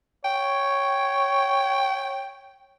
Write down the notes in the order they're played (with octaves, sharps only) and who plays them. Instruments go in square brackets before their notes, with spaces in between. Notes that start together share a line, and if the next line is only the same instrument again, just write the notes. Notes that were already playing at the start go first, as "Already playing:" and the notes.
[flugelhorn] C#5 [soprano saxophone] G5